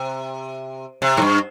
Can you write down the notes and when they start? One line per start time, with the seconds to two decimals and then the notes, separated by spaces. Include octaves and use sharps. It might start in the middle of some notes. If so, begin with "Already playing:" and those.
Already playing: C3
1.02 C3
1.17 G#2
1.22 G2